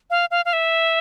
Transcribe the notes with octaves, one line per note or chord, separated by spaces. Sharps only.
F5
F5
F5
E5